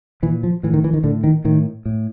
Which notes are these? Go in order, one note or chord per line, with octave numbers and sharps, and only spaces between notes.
A#2 E3
F3
A2 E3
D#3
E3
D#3
A2 D3
D#3
A2 D#3
A2